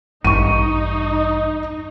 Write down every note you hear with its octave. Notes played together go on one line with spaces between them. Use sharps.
A1 G2 D#4 C#6 D#7